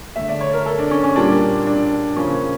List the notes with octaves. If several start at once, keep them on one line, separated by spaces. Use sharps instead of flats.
D3 A3 E5
D5
C#5
A#4
A4
D4
C#4
C#4
A#2 G3 A#3 D4
D4
C#3 F3 A#3 C#4